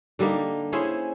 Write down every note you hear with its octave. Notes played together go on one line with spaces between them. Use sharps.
D3 G3 A#3 D#4
C#4 E4 G#4 C5